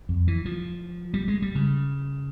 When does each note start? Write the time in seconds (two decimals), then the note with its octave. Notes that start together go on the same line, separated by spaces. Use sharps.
0.09 F2
0.28 E3
0.45 F3
1.14 G3
1.28 G#3
1.42 G3
1.55 C#3